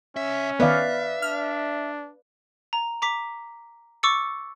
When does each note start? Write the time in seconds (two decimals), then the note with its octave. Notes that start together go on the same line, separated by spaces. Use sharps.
0.17 C2 C#4 E5
0.60 D#3 B3 B4 D5 E5 F5
1.22 D4 F6
2.73 A#5
3.02 A#5 D6 B6
4.03 C#6 D6 E6 A6 C#7